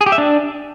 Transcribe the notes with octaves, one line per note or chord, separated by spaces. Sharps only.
G#4
G4
E5
D4